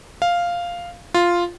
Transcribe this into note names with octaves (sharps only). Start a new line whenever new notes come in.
F5
F4